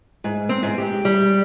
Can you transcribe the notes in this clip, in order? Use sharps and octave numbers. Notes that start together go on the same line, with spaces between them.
G#2
C4
G#2
G4
G3